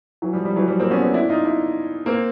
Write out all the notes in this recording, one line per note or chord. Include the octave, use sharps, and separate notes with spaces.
E3 F#3
F3 G3
F3 G3
E3 F#3
F3 G3
A#3 C4
B3 C#4
C4 D4
D4 E4
D#4 F4
D4 E4
A#3 C4